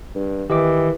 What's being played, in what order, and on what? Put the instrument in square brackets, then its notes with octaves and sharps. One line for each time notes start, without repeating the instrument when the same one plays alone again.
[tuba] G2
[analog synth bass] D#3 [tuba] E3 [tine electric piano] G4 D#5 D6